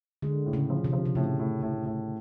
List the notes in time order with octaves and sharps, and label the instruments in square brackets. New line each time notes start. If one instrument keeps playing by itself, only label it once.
[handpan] D3 [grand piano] G#3
[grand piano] A2
[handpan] C#3
[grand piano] F3
[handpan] C3
[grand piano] F3
[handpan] C3
[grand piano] A2 [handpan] C#3
[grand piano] A2
A2
A2